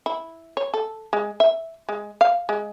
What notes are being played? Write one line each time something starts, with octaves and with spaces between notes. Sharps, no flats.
E4
C#5
A4
G#3
E5
G#3
F5
G#3